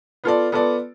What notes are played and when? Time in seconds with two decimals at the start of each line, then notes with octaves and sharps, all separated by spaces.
0.24 B3 F4 A4 D5
0.52 B3 F4 A4 D5